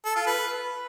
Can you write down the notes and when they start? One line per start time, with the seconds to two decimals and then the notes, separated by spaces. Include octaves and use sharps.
0.06 A4
0.16 F4
0.27 B4